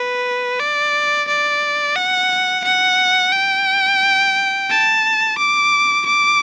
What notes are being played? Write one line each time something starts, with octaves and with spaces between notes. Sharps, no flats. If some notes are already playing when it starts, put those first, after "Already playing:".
Already playing: B4
D5
D5
F#5
F#5
G5
A5
D6
D6